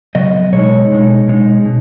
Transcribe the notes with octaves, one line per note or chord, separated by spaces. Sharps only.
C#3 F#3 B3 D#5
B2 G#3 D#4 C#5
B2 G#3 D#4
B2 G#3 D#4
B2